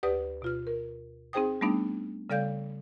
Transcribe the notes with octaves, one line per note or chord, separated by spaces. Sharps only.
D2 G4 B4 D5 D#6
B2 F4 F6
A#4
C4 D#4 G#4 C5 G5 D#6
G3 A3 B3 D4 D#4
C#3 G3 A4 D5 F5 G6